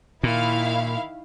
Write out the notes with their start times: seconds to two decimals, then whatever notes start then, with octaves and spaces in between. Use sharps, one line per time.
0.23 A#2 D#3 E4 F5